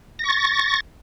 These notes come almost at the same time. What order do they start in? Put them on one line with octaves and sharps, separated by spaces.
A#6 C#6 A6